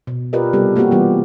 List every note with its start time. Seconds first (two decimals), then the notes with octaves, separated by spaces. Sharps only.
0.07 B2
0.33 F4 G4 A#4 B4 D5 D#5
0.53 C3 G3 B3 F#4 G4 A4
0.76 A3 A#3 C4 F#4 G4
0.91 E3 G3 B3 F4